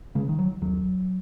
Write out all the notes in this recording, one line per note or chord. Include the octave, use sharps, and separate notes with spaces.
C#3 G#3
D#3
F#3
D#2 F#3